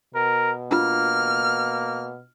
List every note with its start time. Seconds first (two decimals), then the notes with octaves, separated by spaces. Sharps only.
0.15 B2 A#4
0.71 A#3 D4 F4 F6